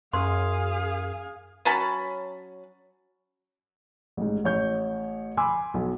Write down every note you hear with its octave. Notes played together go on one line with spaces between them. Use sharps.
F#2 G#4 F5 C6
F#3 C#4 A5 B5
A1 G#2
A1 C#5 G6
G#5 B5 C6 D6 E6
B1